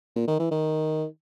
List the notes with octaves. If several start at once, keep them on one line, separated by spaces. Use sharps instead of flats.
A#2
D#3
E3
D#3